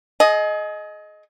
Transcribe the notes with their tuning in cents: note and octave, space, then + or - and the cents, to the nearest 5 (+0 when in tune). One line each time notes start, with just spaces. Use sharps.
G#4 +35 D#5 +0